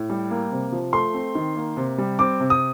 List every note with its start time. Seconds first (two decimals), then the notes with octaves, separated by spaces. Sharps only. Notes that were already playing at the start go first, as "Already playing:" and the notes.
Already playing: A2
0.10 G3
0.30 A#3
0.52 C3
0.72 F3
0.93 A3 C6
1.14 C4
1.35 D#3
1.56 A#3
1.77 C3
1.98 G3
2.19 C4 D6
2.40 C3
2.50 D#6